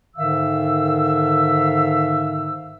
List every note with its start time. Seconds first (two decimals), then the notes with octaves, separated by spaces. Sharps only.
0.16 G#2 D3 D#3 E5 F5 E6